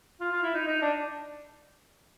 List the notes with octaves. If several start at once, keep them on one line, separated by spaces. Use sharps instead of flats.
F4
F4
E4
D#4
D#4
D4